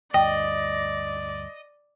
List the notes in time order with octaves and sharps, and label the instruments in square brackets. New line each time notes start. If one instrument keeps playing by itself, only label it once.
[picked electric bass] D2 G2 [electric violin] D5 [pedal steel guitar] D#5 [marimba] G5